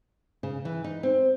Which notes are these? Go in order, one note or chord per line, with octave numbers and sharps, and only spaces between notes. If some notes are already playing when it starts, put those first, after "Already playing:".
C#3
E3
D#4
C4